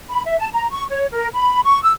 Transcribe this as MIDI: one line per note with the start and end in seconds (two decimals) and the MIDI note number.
0.10 0.22 83
0.25 0.35 76
0.38 0.47 81
0.53 0.67 82
0.71 0.84 85
0.89 1.06 73
1.12 1.28 70
1.33 1.62 83
1.63 1.79 85
1.83 1.93 88